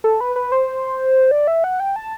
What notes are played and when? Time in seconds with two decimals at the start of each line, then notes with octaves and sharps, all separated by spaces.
0.04 A4
0.21 B4
0.36 B4
0.52 C5
1.31 D5
1.47 E5
1.64 F#5
1.80 G5
1.96 A5